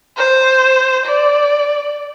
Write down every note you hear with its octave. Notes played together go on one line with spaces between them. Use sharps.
C5
D5